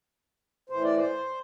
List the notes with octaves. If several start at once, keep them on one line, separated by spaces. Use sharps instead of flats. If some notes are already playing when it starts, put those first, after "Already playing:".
A2 E3 C5
D5
C5